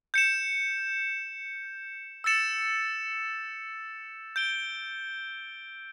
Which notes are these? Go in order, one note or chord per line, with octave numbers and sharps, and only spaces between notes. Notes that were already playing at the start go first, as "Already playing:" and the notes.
G6 C#7 E7
E6 A6 C#7 E7
G6 D7 G7